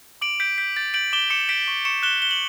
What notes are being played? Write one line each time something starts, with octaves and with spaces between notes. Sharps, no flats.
D6 D7 F#7
G6 B6 D7
G6 B6
G6 A6
G6 D7 F#7
D6 E7 G7
D6 C#7 E7
G6 B6 D7
C#6
C#6 C#7 E7
F#6 E7 G7
F#6 G7
F#7